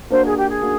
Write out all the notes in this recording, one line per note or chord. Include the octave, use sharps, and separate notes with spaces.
A#3 D4 F#4 C5
G#4
G4
G#4
A#3 D4 F#4